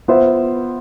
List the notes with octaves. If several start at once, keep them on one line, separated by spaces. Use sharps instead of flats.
B3 F4 C5 E5